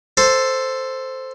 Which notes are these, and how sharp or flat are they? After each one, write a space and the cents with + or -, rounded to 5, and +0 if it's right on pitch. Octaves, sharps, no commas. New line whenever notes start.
A4 +5 C5 +0